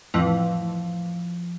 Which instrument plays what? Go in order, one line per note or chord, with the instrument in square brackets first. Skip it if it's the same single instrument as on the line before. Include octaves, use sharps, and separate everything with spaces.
[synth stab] F2 A2 E3 [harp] F3